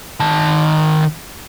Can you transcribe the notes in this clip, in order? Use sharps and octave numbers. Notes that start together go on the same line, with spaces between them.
D#3 A5